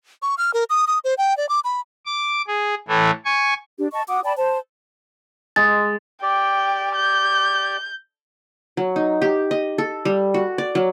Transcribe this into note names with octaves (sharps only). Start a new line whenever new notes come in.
C#6
F6
A#4
D#6
D#6
C5
G5
D5
D6
B5
D6
G#4
A2 E3 A3
G#5 C#6
D4 G4
D#5 A5 C#6
F#4 F#5 D6 D#6
D5 G5 A5 B5
C5 A5
G#3 A6
G4 D5 G5
G6
F#3
D#4
G4
D#5
A4
G3
F#4
D5
F#3